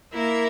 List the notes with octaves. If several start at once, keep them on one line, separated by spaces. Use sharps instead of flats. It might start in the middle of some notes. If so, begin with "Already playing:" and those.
A#3 E4 A#4 E5